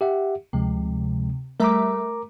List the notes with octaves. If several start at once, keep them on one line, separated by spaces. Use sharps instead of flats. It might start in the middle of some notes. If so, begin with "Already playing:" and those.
G4 E5 F#5
D2 C3 F3 G#3
G3 A3 A#4 E5 A#5 D6